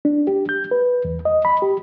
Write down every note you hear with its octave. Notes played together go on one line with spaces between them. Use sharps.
D4
G4
G6
B4
E2
D#5
B5
G4